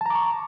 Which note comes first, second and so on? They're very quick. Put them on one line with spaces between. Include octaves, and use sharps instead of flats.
A5 A#5 D6 C#6